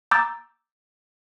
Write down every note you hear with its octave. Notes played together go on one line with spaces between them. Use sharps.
A#5 D6 E6 G6 A6